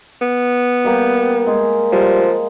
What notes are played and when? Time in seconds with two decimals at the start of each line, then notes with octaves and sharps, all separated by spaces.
0.21 B3
0.84 G3 A#3 G5
1.47 G#3 G#4
1.92 F3 G3